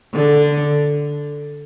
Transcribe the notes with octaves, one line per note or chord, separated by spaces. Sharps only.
D3